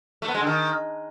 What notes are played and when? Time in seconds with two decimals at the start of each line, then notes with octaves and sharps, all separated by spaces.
0.22 A3
0.28 B3
0.34 G#3
0.41 D3
0.47 D#3